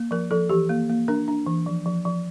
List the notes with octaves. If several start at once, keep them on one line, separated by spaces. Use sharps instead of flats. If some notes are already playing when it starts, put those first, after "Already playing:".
Already playing: A#3
F3 A#4
F3 A4
E3 G4
A#3
A#3
D4 A#4
D4
E3
F3
F3
F3